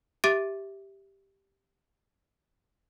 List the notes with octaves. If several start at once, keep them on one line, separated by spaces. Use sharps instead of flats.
G4 E5 D6 A6 D7